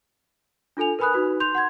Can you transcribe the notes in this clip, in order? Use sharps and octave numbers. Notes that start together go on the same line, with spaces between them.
D4 F4 A4 G#5 F7
A#4 B4 G#5 B5 D#6 F#6
D#4 F#4 B4
C6 G6 F7
F#5 C6 G#6